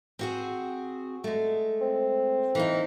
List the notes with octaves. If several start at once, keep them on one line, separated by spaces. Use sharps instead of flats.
C4 F#4 G#4
G#3 A3
C4
E3 A#3 D#4